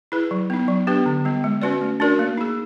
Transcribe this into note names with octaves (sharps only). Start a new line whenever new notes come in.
E4 G#4 B4
F#3
B3 D#4
F#3
B3 D4 G4 B4
D3
G3 B3
G#3
C#4 F#4 B4 D5
A3
D4 F#4 A#4 D5
A#3
D#4 G#4